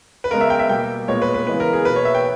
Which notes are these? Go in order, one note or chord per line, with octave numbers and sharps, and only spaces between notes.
B4
C#3 G#3 B3 A#4
E5
G5
E5
B2 G3 A#3 G5
A#2 G#3 B3 C#5
B4
B4
C#3 E3 G#3 B3 B4
A#4
G#4
B2 A#3 B4
C#5
E5
G5